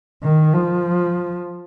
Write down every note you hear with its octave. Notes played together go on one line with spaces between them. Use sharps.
D#3
F3